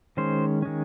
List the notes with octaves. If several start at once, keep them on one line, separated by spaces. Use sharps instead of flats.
D#3 G#3 C#4 C5
D#3 G#3 C#4